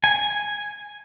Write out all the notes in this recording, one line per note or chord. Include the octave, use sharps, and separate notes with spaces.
G#5